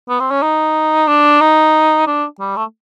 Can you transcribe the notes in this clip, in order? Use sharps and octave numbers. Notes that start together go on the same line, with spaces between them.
B3
C4
C#4
D#4
D4
D#4
D4
G3
A3